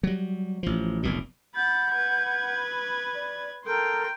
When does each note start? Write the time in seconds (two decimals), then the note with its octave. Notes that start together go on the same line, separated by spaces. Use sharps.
0.03 F#3 G3
0.63 A1 F3
1.03 F1 B1 A#2
1.55 F#5 B5 G6 A6
1.92 B4 G#6
3.14 D5
3.65 A4 A#4 G5 C6